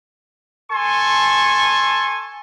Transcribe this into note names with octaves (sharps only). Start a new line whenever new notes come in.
A4 G#5 A5 C6 C#6